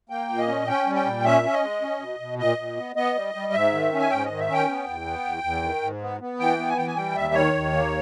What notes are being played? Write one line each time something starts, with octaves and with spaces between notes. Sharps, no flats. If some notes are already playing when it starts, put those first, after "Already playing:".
A#3 G5
A#2
D#5
C#4
C#4 G5
G3
G5
A#2
C#4 E5
C#4
D#5
G#3
C#4
B2
B2
A#2 D#5
A#2
B3
B3 D#5
G3
G3
G#2 E5
D#3
C#4
G#5
G#2 G5
D#3 D#5
E5
C#4 G5
B3
E2
B3
E2
E2
D#3
G#2
B3
B3
E3 G5
B3
G#5
E3 G5
G#5
G3 G5
D#2 E5
D#3 C#5
D#2
A#3